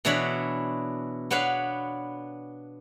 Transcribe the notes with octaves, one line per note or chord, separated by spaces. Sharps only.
B2 E3 D4 E4 C#5 B5
B3 D4 B4 C#5 F5